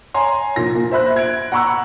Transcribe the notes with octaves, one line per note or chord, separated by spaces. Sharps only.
C#5 G#5 A#5 C6
A#2 F3 A#6
A#3
C5 E5 B5 F#6
G#6 D7
F#5 A#5 B5 C#6 E6 F#6